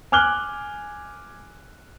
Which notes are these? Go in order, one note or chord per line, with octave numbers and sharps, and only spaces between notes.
G#5 D6 F6 F#6 G7